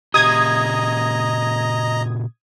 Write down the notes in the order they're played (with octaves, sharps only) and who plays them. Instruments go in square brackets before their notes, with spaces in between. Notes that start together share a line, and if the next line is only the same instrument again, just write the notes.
[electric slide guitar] A#2 C#3 G4 [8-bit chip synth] D#5 A#5 [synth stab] D#6 G#6